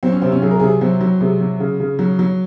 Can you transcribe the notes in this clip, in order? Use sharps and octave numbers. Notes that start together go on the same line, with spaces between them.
F#3 C4
C#4
C3 C4
C#4
F#3 G#4
A#4
C3 G#4
F#3 C4
F#3
C3 G#3
F#3
C#3
C#3
F#3
F#3